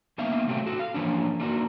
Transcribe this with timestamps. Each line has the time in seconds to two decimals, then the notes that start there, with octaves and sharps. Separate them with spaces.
0.18 A#3 B3 D#4 E5 F5
0.47 A2 C3 F#3 A3 G4
0.66 F#4 A4
0.79 F5
0.94 E3 F3 A#3 C#4 D4
1.40 A3 A#3 D4 D#4 F#4 A#4